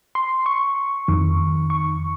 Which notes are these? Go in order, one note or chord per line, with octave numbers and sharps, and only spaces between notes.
C6
C#6
F2 D#3
C#6